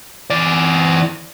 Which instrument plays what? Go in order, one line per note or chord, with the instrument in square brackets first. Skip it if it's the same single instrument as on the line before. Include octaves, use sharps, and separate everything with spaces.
[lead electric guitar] E3 D5